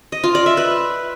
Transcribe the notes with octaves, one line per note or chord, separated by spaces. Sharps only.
D#5
F4
D5
E5
B4